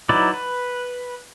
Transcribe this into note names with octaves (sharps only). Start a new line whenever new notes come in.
F#3 D#4 E4 B4 D5
B4